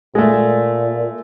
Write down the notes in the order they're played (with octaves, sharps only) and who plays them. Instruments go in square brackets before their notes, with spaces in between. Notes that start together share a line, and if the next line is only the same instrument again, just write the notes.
[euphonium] A#2 [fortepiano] G#3 A3